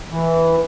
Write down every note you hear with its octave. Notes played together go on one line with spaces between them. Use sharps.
E3